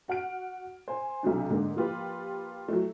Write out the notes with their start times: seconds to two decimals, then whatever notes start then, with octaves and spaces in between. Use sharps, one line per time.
0.08 F#4 F#5 F6 D7
0.88 C5 G#5
1.23 B1 C3 F#3 D4
1.50 G#2 D3 A#3
1.76 F3 A#3 F4 G4 B4
2.68 F#3 A3